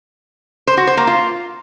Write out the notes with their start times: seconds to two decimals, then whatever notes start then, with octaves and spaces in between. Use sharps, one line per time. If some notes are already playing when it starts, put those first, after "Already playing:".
0.67 C5
0.77 F#4
0.87 C5
0.97 A#3
1.07 F4